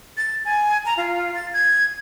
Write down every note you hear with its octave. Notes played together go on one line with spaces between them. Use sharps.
A6
G#5
A#5
F4
A6
G#6